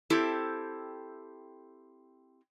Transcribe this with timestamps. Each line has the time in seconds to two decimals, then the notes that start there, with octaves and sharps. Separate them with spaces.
0.10 C4 E4 G4 A4